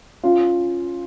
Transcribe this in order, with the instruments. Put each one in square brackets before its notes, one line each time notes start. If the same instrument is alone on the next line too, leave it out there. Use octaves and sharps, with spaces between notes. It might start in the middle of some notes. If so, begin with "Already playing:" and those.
[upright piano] C#4 F4